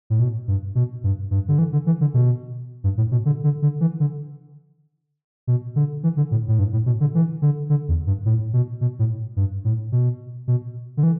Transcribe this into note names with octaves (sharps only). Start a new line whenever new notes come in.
A2
B2
G2
B2
G2
G2
D3
E3
D3
E3
D3
B2
G2
A2
B2
D3
D3
D3
E3
D3
B2
D3
E3
D3
A2
A2
G2
A2
B2
D3
E3
D3
D3
E2
G2
A2
B2
B2
A2
G2
A2
B2
B2
D3
E3